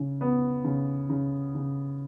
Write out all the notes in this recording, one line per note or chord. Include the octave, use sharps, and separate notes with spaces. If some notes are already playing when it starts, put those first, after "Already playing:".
Already playing: C#3
B3
C#3
C#3
C#3